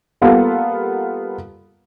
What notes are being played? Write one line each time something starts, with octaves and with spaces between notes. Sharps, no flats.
G3 A#3 B3 F4 A4 A#4